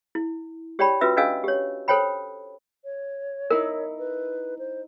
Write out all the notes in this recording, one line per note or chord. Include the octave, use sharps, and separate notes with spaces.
E4
G4 C#5 D5 G5 A5 B5
C#4 F4 F#4 B4 E5 E6
C#4 D4 D#5 F5 G#5 E6
G4 C#5
A4 C5 C#5 G5 B5
C#5
D#4 E4 A#4
B4
C5